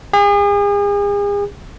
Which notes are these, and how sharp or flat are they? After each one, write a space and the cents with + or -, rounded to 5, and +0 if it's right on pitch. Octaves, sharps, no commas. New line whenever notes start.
G#4 -40